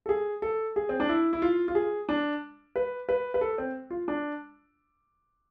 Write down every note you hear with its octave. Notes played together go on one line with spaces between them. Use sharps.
A4
G#4
A4
G#4
C4
D4
E4
E4
F4
F4
G#4
D4
B4
B4
B4
A4
C4
F4
D4